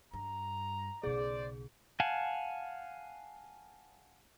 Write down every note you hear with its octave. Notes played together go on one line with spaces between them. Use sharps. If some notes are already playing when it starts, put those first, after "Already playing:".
G2 A#5
B1 C#3 G#4 C5 D5
F5 F#5 G#5 A5